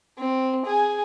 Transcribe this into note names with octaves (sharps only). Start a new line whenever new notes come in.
C4
G#4 G#5